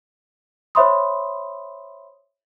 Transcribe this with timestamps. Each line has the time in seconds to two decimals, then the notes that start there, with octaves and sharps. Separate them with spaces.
0.75 C5 C#5 E5 B5 C6 D#6